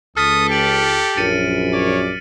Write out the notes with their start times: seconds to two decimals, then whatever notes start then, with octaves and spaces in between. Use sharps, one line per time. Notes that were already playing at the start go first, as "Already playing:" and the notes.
0.17 C#2 A4 D#6 F6 A6 B6
0.50 G4 B6 D7 F#7
1.17 A#1 F#2 A6 C#7 D#7
1.73 C#5 D5